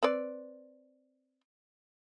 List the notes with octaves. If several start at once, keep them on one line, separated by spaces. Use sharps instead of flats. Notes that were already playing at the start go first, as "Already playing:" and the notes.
C4 B4 D5